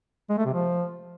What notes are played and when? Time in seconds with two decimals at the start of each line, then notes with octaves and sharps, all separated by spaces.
0.30 G#3
0.38 A3
0.46 C3
0.54 F3